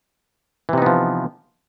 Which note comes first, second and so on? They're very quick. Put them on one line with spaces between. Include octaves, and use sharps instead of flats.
E3 C3 D#4 B3 F3